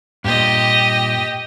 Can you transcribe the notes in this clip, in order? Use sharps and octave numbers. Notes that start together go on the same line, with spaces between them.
G2 A#2 G4 D#5